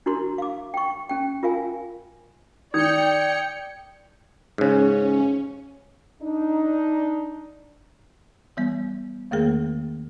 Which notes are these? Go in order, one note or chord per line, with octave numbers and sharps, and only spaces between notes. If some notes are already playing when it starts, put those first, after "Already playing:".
D4 E4 F#4 A#4 C6
F5 D6
G5 C#6
C#4 G5
F4 A#4 F5 G#5
D#3 D5 G5 D#6 G6 G#6 C#7
G#2 C#3 C#4
D4 D#4
E3 G3 B3
E2 D#3 A3 A#3 G#4 A#4